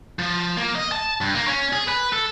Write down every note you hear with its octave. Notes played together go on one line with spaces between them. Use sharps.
F3
A#3
D#5
A5
G2
A#3
C#4
G#4
B4
A4